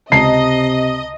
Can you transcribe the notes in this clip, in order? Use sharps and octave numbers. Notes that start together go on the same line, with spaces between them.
C#2 C3 D#5 A5 A#5 C7